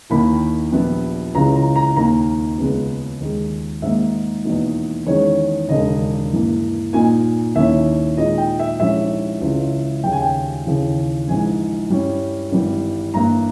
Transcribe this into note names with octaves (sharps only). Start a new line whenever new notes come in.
D#2 D#3 A#3 E4 B5
A#1 A#2 G3 B3
C#2 C#3 E3 A#5
A#5
A#5
D#2 D#3 A#3 A#5
C#2 C#3 G#3 B3
D#2 D#3 G#3
G#2 D#3 A#3 E5
E2 B2 A#3 D#4
E2 D#3 G#3 C#4 C#5
E1 D#2 C#3 D#5
G2 E3 A#3
A#2 A#3 D#4 G#5
D#2 D#3 A#3 C#4 E4 E5
A#2 G#3 D#4 D#5
G5
E5
A#1 G#2 G3 C#4 E4 E5
C#2 C#3 E3
D#2 C#3 G3 G5
G#5
G5
D#2 C#3 E3
A#1 G#2 E3 G#5
G2 G3 C#4 E4
G#1 G2 E3 G3
G1 G2 E3 A#3 A#5